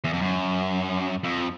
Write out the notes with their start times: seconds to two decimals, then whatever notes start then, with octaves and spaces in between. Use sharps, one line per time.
0.04 E2
0.13 F2
0.21 F#2
1.24 F2